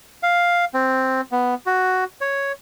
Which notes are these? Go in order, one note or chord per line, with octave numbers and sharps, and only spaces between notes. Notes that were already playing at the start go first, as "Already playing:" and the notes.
F5
C4
B3
F#4
C#5